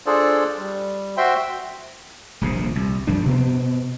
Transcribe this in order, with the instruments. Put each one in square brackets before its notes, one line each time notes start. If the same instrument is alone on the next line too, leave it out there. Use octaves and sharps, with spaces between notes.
[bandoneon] D4 F4 G#4 A4 C5 D5
G3
F#4 C5 E5 G5 C6
[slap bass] D#1 A#1 C3
C2
F#2 F3 D4
B2 B3 C4